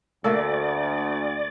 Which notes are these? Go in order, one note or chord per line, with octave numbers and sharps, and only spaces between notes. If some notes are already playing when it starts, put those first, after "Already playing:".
D2 A3 A#3 A4 D5